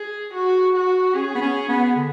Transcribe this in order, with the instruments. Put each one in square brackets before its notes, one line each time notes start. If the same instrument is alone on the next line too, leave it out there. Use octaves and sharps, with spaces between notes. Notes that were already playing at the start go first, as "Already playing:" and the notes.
Already playing: [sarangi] G#4
F#4
F#4
[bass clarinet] C#4 [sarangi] G#4
[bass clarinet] B3
C#4
B3
D3